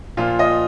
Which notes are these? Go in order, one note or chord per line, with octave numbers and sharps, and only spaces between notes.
A#2 F3 F4
D#5